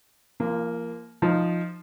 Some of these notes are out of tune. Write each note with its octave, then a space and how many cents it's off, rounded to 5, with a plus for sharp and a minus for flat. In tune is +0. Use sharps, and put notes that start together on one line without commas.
F3 -30 A#3 +0
F3 +0 D#4 +0